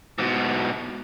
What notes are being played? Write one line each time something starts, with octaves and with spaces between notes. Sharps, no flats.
G#2 B2